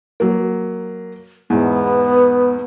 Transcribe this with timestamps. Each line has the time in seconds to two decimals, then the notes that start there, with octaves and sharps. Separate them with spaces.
0.20 F#3 A#3
1.50 E2 G#2 B3